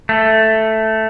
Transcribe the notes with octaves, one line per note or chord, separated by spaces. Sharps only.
A3